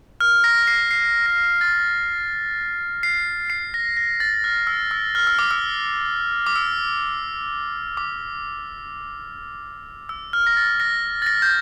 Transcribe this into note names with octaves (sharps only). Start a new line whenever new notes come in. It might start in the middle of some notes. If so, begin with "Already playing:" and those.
F6
A#6
A#6
C7
C7
A#6
A6
C7
C7
A#6
A#6
A6
F6
E6
E6
F6
E6
D6
E6
D6
E6
D6
E6
F6
A#6
A6
A#6
A6
A#6
G6